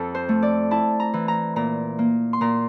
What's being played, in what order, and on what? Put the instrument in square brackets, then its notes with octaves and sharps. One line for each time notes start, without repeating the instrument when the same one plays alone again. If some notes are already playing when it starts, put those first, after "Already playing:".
Already playing: [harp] F2 A4
C5
A3
D5
E4 A5
A#5
E3
A#5
A#2 A#5
A#3
C6
A#2 A#5